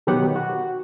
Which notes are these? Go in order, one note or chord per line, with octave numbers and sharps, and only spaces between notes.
B2 D#3 F#3 B3 G4 F#5
F#4